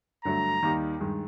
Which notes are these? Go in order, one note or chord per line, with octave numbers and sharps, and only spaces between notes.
G2 D3 F#3 A3 A#5
D#2 D#3 G3 A#3 D#4
G2 D#3 G#3